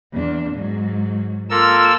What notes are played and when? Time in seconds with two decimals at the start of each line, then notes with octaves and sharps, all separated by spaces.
0.12 E2 D4
0.54 G#2 F#3
1.50 A#3 F4 A4 A#4 E6